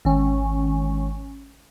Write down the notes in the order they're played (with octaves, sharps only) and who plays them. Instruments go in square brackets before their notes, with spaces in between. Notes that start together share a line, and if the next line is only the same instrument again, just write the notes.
[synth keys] G#1 C#4